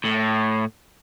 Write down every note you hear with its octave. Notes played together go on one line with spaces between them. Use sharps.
A2